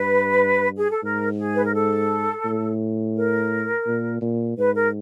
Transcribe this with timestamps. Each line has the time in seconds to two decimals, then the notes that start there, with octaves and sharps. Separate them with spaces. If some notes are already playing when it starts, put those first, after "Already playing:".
Already playing: G2 B4
0.77 G#4
0.90 A4
1.03 G#2 A#4
1.38 G#4
1.55 B4
1.64 A#4
1.73 A4
2.45 A2
3.16 A#4
3.86 A#2
4.21 A#2
4.57 G#2 B4
4.75 A#4